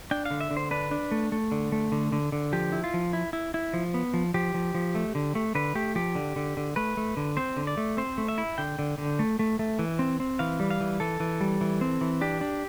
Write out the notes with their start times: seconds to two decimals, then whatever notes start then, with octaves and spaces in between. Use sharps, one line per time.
0.11 D4 G5
0.26 F5
0.31 D3
0.41 E5
0.51 D3
0.57 C5
0.71 D4 B4
0.91 D4
1.11 A3
1.32 A3
1.52 D3
1.72 A3
1.92 D3
2.12 D3
2.32 D3
2.53 F3 G4
2.72 E4
2.84 F4
2.94 F3
3.13 E4
3.33 E4
3.54 E4
3.74 F3
3.94 B3
4.14 F3
4.34 F3 G4
4.54 F3
4.75 F3
4.95 A3
5.15 D3
5.35 A3
5.55 D3 B4
5.75 A3 G4
5.95 F3 G4
6.15 D3
6.36 D3
6.57 D3
6.76 A3 B4
6.97 A3
7.17 D3
7.37 C4 C5
7.57 D3
7.67 D5
7.77 A3
7.97 C4 C5
8.18 A3
8.28 E5
8.38 E4
8.58 D3 G5
8.79 D3
8.98 D3
9.19 A3
9.39 A3
9.59 A3
9.79 E3
9.99 C4
10.20 C4
10.39 E3 F5
10.60 G3
10.70 F5
10.80 E3
11.00 E3 A4
11.20 E3
11.41 G3
11.61 E3
11.81 C4
12.01 E3
12.21 D4 G4
12.41 D4